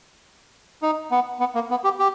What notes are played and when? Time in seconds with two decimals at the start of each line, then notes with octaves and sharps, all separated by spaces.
0.82 D#4
1.11 B3
1.40 B3
1.55 A#3
1.70 B3
1.84 G4
1.99 G4